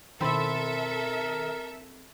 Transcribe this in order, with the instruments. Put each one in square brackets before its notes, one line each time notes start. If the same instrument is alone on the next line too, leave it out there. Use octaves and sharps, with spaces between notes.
[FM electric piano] B2 D#3 [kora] C4 E4 [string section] A4 E5 [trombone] A#4